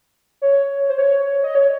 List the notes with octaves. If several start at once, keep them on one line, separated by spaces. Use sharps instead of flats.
C#5
C5
C#5
D#5
C#5